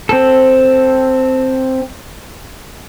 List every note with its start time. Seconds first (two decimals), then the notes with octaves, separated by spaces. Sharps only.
0.09 C4 A4